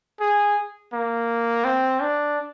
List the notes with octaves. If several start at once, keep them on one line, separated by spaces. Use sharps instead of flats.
G#4
A#3
C4
D4